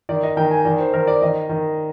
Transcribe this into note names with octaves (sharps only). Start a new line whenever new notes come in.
D#3 D5
D#5
D#3 G5
G#5
D#3 D5
C5
D#3 A#4
D5
D#3 D#5
D#3